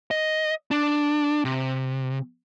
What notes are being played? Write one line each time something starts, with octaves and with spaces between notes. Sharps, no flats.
D#5
D4
C3